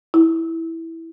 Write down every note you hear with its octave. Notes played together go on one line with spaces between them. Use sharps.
E4